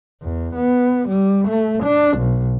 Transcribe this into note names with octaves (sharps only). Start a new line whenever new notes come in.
E2
B3
G3
A3
D4
B1